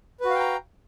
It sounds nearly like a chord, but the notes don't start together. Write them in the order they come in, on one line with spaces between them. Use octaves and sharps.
B4 F#4 F5 G5 A#5